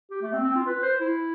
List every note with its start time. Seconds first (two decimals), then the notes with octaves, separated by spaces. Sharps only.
0.11 G4
0.22 A3
0.33 C4
0.44 C4
0.55 F4
0.67 B4
0.83 C5
1.00 E4